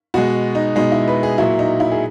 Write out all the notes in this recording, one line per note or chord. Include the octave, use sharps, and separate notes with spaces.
B2 G#3 F#4
D#4
B2 G#3 D#4
E4
B4
G#4
A#2 F#3 E4
D#4
E4
G#4